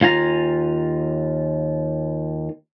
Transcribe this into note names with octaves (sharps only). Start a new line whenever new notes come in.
D#2 F4 G#5 A#5